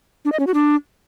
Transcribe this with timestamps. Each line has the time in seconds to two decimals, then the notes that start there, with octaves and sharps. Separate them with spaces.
0.25 D4
0.32 D#5
0.40 C#4
0.47 F#4
0.54 D4